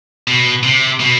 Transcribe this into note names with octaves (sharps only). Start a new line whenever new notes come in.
B2
C3
B2